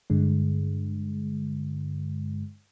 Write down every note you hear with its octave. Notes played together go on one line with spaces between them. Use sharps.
G2 D3 G#3